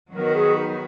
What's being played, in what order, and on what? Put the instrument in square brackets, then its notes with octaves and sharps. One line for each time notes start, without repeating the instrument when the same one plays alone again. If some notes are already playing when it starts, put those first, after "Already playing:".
[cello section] D#3 F#3 B3 F#4 [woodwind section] A#4
[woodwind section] G#4
D#4